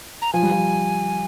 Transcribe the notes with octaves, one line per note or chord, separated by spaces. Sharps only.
A#5
F3 G#5
G3
F3